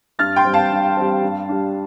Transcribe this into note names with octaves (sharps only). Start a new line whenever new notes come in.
G2 F6 A6
G5 C6
G3 C4
F5 A5
G2
G3 C4
G2
G3 D4